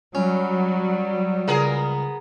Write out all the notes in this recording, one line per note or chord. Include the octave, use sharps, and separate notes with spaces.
F#3 G3 C#4
C#2 B3 G#4 A#4